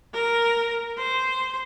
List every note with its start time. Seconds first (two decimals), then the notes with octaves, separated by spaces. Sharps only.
0.14 A#4
0.98 C5